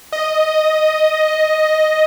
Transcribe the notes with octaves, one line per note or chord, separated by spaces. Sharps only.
D#5